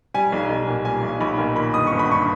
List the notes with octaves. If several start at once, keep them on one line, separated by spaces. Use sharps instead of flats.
G3 G#5
B1
B1
A#2
G3 G#5
B1
B1 B5
A#2
D#3 B5
G1 D#6
G1 C#6
B5
G2 C#6